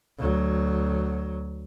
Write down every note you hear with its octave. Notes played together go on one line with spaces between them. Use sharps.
D2 F#3